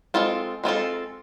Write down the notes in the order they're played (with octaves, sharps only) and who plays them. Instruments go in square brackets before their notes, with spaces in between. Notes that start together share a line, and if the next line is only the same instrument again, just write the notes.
[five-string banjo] G#3 C4 F4 A4
G#3 C4 F4 A4